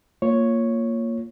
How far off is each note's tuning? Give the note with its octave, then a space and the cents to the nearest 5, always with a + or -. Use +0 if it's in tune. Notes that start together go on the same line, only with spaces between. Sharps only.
A#3 -10 F4 +0 C#5 +0